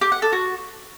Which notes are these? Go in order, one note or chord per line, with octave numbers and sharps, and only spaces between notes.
G4
F#5
A4
F#4